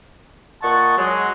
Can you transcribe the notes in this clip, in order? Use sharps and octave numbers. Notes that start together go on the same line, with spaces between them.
A#2 D#5 F#5 A5 C#6
F#3 G#3